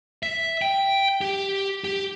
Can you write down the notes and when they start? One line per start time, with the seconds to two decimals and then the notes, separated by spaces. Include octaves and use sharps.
0.23 E5
0.62 G5
1.21 G4
1.84 G4